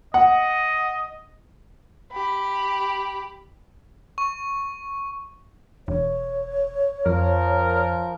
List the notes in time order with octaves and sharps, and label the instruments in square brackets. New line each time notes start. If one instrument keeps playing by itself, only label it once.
[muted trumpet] D#5 [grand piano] F#5
[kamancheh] G4 B5
[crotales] C#6
[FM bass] E1 [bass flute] C#5
[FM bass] F2 [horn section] F3 A#4